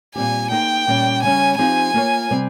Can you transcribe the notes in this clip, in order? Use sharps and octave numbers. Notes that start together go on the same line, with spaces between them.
A#2 G3 C4 G4 G#5
A#3 D#4 G#4 C5 G5
A#2 G3 C#4
C#3 G3 C#4 G#5
F3 C4 D#4 G4 C5 G#5
A#3 F4 A#4 C#5
C3 G3 C4